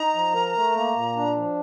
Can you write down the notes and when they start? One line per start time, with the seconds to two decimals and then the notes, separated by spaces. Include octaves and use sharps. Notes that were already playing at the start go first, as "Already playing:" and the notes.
Already playing: D#4 A#5
0.15 F3
0.35 A#4
0.55 A3
0.75 A#3
0.95 A#2
1.16 D4
1.36 F3